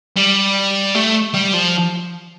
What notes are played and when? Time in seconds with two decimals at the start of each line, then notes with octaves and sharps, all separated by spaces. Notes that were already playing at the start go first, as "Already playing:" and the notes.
0.16 G3
0.95 A3
1.34 G3
1.54 F3